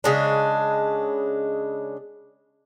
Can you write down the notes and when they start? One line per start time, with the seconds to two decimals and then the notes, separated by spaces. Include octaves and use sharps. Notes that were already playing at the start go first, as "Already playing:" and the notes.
0.04 C#3 G#3 D4